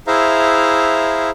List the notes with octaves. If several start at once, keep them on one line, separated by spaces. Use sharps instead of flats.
E4 G#4 C5 E5 F5 A#5